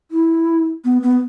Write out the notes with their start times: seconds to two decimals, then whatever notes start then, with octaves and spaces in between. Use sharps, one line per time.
0.11 E4
0.85 B3
1.02 B3